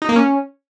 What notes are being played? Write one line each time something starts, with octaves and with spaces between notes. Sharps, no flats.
D#4
A#3
C#4